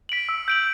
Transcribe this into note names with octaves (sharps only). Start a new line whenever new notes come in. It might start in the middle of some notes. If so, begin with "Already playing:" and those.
B6 D7 F#7
E6
G6 D7 F#7